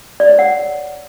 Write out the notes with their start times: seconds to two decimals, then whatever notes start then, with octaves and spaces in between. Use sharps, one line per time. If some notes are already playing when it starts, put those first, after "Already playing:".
0.20 D5
0.29 C#5
0.39 F#5